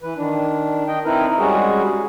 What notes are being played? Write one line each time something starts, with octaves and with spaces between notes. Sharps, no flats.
E3 B4
D#3 D4
D#5 G5
C4 D#4 E4 A#4 B4
G3 G#3 C#4 F#4 G#4